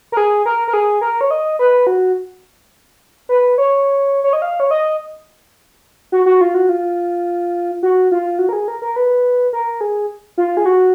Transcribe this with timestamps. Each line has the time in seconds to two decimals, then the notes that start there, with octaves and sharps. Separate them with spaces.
0.12 A#4
0.17 G#4
0.46 A#4
0.68 A#4
0.73 G#4
1.01 A#4
1.21 C#5
1.31 D#5
1.59 B4
1.87 F#4
3.29 B4
3.58 C#5
4.24 C#5
4.33 D#5
4.42 F5
4.60 C#5
4.71 D#5
6.12 F#4
6.26 F#4
6.41 F4
6.54 F#4
6.69 F4
7.83 F#4
8.12 F4
8.39 F#4
8.49 A#4
8.53 G#4
8.68 A#4
8.82 A#4
8.96 B4
9.53 A#4
9.81 G#4
10.38 F4
10.57 G#4
10.66 F#4